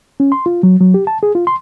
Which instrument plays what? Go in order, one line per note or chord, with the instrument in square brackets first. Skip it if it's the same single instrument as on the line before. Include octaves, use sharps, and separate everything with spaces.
[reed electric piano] C#4
C6
F4
F#3
F#3
G4
A5
G#4
F4
C6